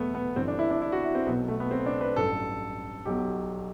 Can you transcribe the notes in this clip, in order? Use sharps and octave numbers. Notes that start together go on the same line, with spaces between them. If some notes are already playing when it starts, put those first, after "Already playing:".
Already playing: E2 B2 F#3 A3 B3
B3
G1 G2 E3 C4
D4
E4
D4
E4
F#4
E4
C4
B1 B2 F#3 B3
A3
B3
C4
D4
B4
A1 G2 F#3 A4
B1 B2 F#3 G4